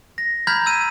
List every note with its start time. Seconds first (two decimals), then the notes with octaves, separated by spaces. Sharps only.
0.18 A#6
0.47 A#5 B5 F6 G6 G#6 B6
0.66 E6 D#7